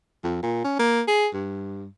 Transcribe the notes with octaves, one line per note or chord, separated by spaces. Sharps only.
F2
A#2
C#4
A#3
G#4
G2